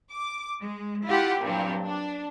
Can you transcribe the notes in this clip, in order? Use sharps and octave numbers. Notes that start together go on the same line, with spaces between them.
D6
G#3
E4 F4 G4 F#5
G2 A#2 F#3 C4 G4
D4